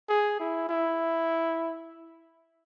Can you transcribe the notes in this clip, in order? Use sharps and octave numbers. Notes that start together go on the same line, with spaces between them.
G#4
E4
E4